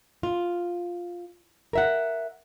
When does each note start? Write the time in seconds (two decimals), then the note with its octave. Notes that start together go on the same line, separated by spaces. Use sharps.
0.23 F4
1.73 A#4 E5 F#5